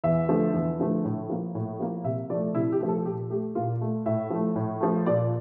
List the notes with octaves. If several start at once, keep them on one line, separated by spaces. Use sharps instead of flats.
E2 E5
D3 F3 A3
E2
D3 F3 A3
A2
F3 A#3
A2
F3 A#3
C3 E5
F3 A3 D5
C3 E4
G4
F3 A3
A4
A#2 G4
A3 G4
A#2 F4
A3
A2 E5
F3 A3
A2
F3 A3
A#2 D5